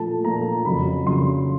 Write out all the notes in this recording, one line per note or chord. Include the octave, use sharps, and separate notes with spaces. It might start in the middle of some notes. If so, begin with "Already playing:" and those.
Already playing: A#2 F3 A3 A5
A#2 F3 A3 A#5
F2 C#3 F#3 B5
F2 C#3 F#3 C6